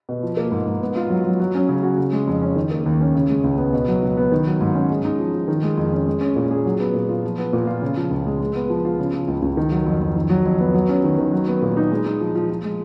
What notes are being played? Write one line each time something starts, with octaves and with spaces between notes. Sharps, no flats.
B2
F3
A#3
G#2
G#2
B3
F4
F#3
F#3
F#3
C#4
C#3
F#4
C#3
G#3
F2
C#4
D#3
A#3
D#2
C#4
C#3
G#3
C#2
B3
B2
F#3
C#2
B3
D#3
F#3
G#2
C#4
G#3
D#4
F3
F3
D#3
G#3
F2
C#4
G#3
C#4
A#2
G#4
F#3
B3
A#2
F4
F3
B3
A#2
F4
C#3
F3
C#2
G#3
G#3
B3
F3
F4
C#3
F3
C#2
C#2
D#3
F#3
F2
F2
D#3
F#3
F2
B3
F#3
C#4
D#3
D#3
F#3
B3
A#2
D#4
G#3
D#4
F3
F3
F3
G#3